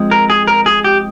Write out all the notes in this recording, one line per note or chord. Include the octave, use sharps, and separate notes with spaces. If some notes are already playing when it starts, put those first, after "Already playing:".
Already playing: F3 G#3 C4
A#4
G#4
A#4
G#4
G4